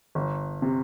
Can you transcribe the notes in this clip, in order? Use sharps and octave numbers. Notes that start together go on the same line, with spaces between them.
G1
C3